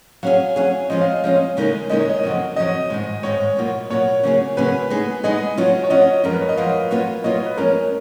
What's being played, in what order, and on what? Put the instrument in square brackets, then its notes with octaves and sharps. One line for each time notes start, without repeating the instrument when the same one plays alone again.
[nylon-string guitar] F#3 C#4 G#4 [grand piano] F5
[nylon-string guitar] F#3 C#4 G#4
[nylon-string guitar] F3 G#3 C#4 [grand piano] D#5
[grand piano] F5
D#5
[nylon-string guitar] F3 G#3 C#4
D#2 C#3 G#3 D#4 A#4
[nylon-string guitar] D#2 C#3 G#3 D#4 A#4 [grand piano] D#5
[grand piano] C#5
D#5
[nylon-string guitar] F2 C#3 F#3
[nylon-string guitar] F2 C#3 F#3 [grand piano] D#5
[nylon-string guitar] G#2 D#3 G#3
[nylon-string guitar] G#2 D#3 G#3 [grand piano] C#5
[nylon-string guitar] B2 F#3 A#3 F4
[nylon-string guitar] B2 F#3 A#3 F4 [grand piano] C#5
[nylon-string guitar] C#3 F#3 A#3 C#4 G#4
[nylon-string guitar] C#3 F#3 A#3 C#4 G#4 [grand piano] B4
[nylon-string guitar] G#3 B3 D#4 G#4
[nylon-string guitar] G#3 B3 D#4 G#4 [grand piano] D#5
[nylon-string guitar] F#3 C#4 F4
[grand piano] C#5
[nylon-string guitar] F#3 C#4 F4 [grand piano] D#5
[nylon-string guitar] F#2 F3 G#3 [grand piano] A#4
[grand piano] B4
C#5
D#5
[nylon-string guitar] F#2 F3 G#3 [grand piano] F5
[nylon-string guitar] F#3 A#3 F4 B4
[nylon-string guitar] F#3 A#3 F4 B4 [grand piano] D#5
[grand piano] C#5
B4
[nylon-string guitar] F#2 F3 G#3 C#4 [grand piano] A#4